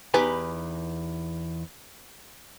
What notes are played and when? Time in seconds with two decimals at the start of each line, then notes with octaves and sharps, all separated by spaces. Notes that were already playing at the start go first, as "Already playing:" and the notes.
0.14 E2 D#4 G4 B4 G#5